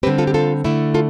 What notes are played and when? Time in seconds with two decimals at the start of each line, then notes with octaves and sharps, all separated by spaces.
0.03 D3 G3 C4 G4 B4
0.18 F4 A4
0.27 G4
0.34 F4 A4
0.64 D3 A3 E4
0.94 F4 A4